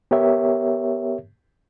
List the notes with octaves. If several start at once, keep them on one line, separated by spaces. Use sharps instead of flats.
B3 G4 A#4 C#5 E5